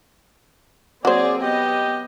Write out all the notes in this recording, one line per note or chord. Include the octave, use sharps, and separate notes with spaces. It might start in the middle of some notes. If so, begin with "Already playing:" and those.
F#3 A#3 C4 G#4 C5 D5
B3 G4 D#5